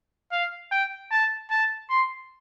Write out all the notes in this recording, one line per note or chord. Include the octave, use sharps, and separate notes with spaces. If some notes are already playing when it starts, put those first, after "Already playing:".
F5
G5
A5
A5
C6